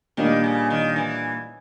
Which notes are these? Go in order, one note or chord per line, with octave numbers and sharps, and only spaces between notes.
A#2 D#3 G3 A#3 D4
C#3
D#3
E3